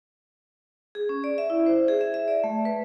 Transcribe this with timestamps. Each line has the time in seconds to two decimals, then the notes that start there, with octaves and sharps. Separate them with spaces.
0.95 G#4
1.09 C#4
1.24 D5
1.38 E5
1.50 E4
1.66 C5
1.88 G#4
2.01 E5
2.14 E5
2.28 D5
2.44 A3
2.65 B4